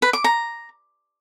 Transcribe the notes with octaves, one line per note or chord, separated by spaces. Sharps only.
B4
D6
A#5